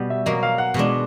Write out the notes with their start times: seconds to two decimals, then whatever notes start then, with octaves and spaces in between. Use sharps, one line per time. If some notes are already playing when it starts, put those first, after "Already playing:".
Already playing: B2 G3 B3
0.10 E5
0.26 B2 F#3 A#3 D#5
0.43 F5
0.58 F#5
0.74 B2 G#3 B3 D4